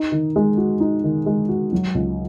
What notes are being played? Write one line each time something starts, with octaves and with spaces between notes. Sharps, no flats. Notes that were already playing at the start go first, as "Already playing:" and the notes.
Already playing: D#4
D#3
G#3
F#4
D#4
D#3
G#3
F#4
F#3
C#2